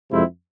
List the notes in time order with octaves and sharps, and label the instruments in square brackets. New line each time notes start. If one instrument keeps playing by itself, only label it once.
[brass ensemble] F2 C3 G#3 C4 E4